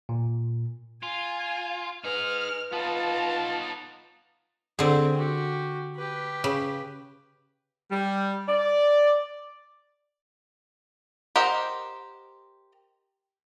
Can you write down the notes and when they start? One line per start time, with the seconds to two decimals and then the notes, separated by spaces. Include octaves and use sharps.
0.09 A#2
1.03 F4 G#5
2.04 D#4 G#4 B4 F6
2.72 B3 D#4 F4 A5
4.79 D3 C4 G#4
5.17 F#4 G4
5.96 G4 B4
6.44 C#3
7.90 G3
8.48 D5
11.36 G4 A#4 C5 D#5 F#5